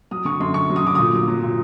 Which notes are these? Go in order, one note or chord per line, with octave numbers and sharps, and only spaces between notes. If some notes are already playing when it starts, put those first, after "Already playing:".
F#3 D#6
D3 C#6
F#2 C6
F#2 C#6
F#3
D#6
D3 D6
A#2 D#6
F#3
F#3
A#2